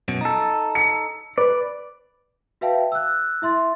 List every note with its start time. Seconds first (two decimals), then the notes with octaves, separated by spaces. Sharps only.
0.08 F#2 B2 F#3
0.21 D#4 A4
0.75 C#7
1.38 B4 D5
2.61 F#4 B4 E5 F5 G5 A5
2.92 E6 F#6
3.42 E4 E5 C6 A6